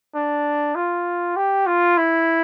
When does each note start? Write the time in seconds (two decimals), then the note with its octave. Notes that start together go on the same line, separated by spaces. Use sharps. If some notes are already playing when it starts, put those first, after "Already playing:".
0.15 D4
0.75 F4
1.36 G4
1.67 F4
1.98 E4